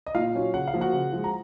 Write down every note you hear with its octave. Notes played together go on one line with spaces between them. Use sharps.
D#5
A#2 F4 F5
F#3 C#4 F4
C#3 F#5
F5
F3 A#3
F#4 F#5
C#3
F3 G#3
A#5